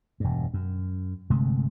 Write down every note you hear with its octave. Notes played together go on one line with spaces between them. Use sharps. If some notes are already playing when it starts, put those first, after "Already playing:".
E1 G2
F#2
G1 C3 G#3 A3